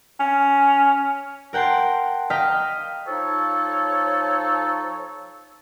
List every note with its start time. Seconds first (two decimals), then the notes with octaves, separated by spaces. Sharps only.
0.20 C#4
1.53 A#4 F#5 G5 A5 C6
2.30 D#5 F5 G5 A#5 B6
3.07 F3 D#4 A4 C#5